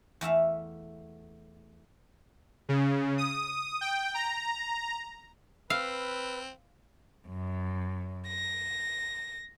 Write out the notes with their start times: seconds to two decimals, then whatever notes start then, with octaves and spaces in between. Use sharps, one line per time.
0.21 E2 A3 E5 F5
2.69 C#3
3.18 D#6
3.81 G5
4.14 A#5
5.70 C4 B4 F5 E6 F6
7.27 F#2
8.27 A#6